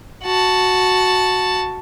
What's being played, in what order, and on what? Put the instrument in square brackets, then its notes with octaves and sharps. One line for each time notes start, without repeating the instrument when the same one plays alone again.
[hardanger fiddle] F#4 A5